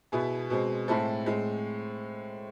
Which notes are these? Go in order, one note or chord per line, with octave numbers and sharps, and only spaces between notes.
B2 B3 E4 G#4
B2 G#3 C4
A2 G#3 C4 E4 A4
A2 G#3 C4